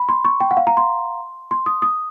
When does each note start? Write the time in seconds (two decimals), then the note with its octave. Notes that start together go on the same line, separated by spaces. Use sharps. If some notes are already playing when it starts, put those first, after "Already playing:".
Already playing: B5
0.09 C6
0.25 C#6
0.40 G5
0.51 F#5
0.57 F5
0.67 A#5
0.77 C6
1.51 C6
1.66 D#6
1.82 D#6